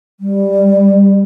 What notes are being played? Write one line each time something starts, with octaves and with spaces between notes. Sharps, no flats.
G3